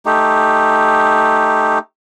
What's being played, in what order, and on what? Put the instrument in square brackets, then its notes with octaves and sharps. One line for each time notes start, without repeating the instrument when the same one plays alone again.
[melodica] A3 D#4 G4